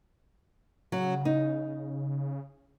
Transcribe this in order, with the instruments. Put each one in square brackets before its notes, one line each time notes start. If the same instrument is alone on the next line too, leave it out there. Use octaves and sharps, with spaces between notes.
[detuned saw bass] C#3 [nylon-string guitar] F#3
[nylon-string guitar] D#4